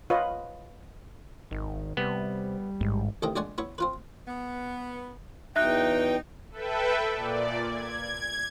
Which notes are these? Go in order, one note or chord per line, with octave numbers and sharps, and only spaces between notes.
F4 B4 C#5 D#5
G#1 D#3
C3 G3 B3
A1 G#2
A1 A2 C3 D#3 D#5 G5
A#1 G#3 D5 F#5 G#5 C#6
B3 E4 C#5
C4 F4 B4
B3
E2 F#3 D#4 E5 G5 F#6
A4 B4 E5 G5
A#2 D5
G#6